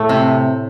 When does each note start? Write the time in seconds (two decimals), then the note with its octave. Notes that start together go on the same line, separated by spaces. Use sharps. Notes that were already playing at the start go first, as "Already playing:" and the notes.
Already playing: A2 A3
0.09 C3